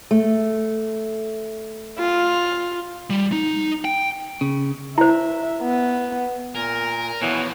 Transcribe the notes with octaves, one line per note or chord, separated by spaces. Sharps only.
A3
F4
G3
D#4
G5
C#3
E4 C5 E5
B3
A#2 A#4 G#5
B2 E3 F3 B3 C#5